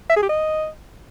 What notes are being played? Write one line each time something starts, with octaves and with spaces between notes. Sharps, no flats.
E5
G#4
G4
D#5